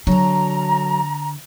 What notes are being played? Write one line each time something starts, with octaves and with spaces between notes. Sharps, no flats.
D3 F#3 A4 A#5